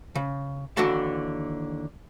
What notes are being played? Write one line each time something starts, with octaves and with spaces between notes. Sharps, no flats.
C#3
D#2 D3 E3 F#4 A5